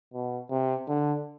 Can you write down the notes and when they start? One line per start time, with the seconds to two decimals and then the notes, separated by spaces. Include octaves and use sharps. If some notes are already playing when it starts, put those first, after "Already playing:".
0.14 B2
0.50 C3
0.87 D3